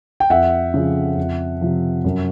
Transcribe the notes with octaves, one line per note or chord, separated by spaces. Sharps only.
G5
F2 E5 F#5
C#3 F3
F2
C3 F3
F#2